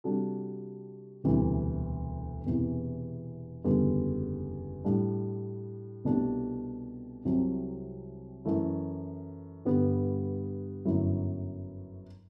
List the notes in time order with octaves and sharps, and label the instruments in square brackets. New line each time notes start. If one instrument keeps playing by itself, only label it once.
[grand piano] C3 G3 D4 F#4 A4
E1 D2 C3 E3 G3
E1 E2 C3 E3
F#1 E2 D3 G3
A2 G3 D4
C2 B2 A3 D4 G4
C2 C3 F#3 C4
F#2 E3 A3 E4
G2 D3 G3 B3
G1 F#2 F#3 A3 E4